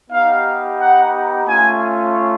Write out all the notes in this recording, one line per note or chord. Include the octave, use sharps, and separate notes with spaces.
B3 D#4 G4 F5
F#5
A3 C#4 F4 G#5